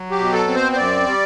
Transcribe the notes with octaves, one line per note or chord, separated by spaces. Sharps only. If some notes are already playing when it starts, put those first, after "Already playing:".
Already playing: F#3
G4
B2
A4
C4
C5
C5
F#2 D5
G3